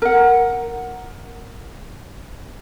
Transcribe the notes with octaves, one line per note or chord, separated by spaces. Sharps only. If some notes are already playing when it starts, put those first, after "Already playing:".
A#4 F#5